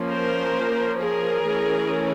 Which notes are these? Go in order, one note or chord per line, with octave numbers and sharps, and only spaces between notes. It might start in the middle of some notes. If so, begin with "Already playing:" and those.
Already playing: F3 A#3 C#4
A#4 C5
G#4 A#4
E3 A3 C#4